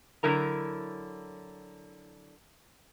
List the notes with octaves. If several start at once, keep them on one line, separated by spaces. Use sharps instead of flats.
D3 F#3 E4 A#4 A#5